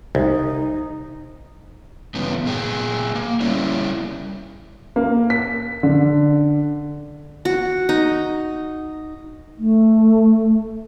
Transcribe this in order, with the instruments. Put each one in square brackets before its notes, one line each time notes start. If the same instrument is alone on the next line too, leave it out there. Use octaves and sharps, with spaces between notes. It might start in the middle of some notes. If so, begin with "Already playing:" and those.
[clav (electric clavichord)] C2 [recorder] D#4
[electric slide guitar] G2 C#3 E3 B3 C#4
A#2 G#4 G5
A#3
G3 C#4 E4 C#5 D5
[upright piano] A#3
B6
D3
[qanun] F#4
D#4
[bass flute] A3